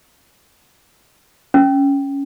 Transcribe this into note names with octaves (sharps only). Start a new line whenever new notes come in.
C#4